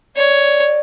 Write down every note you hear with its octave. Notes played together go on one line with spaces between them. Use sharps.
C#5 D5